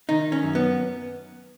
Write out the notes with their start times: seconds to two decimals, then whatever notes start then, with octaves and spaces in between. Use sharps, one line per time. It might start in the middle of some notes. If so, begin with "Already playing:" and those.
0.09 D#3 D#4
0.32 C#4
0.43 F#2
0.55 B3